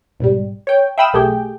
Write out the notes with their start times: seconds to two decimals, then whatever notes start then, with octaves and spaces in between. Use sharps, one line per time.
0.20 B1 G#2 G3
0.67 C#5 G5
0.98 E5 F5 G5 B5 D#6 E6
1.13 B1 A3 G4 G#4 G5